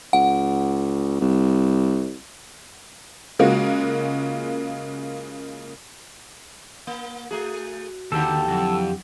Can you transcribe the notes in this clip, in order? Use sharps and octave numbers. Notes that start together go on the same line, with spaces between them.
C#2 F#5
C2
C#3 G#3 A#3 F4 F#4
A#3
A3 F#4 G#4
D#2 D3 G4 A4
F2 F#3 E4 F#5